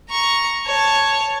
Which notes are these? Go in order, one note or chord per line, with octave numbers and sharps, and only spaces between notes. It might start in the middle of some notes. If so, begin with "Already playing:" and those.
A#5 C#6
C#5 A5